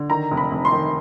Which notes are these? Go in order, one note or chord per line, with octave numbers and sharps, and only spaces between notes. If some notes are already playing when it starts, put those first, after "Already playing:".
Already playing: D3
D#3 A#5
F1
B5
F1
C6
D#3